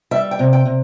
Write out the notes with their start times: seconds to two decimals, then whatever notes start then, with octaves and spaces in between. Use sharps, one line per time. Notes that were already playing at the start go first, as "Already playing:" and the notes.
0.11 G3 E5
0.31 G5
0.39 C3
0.53 G5
0.65 C3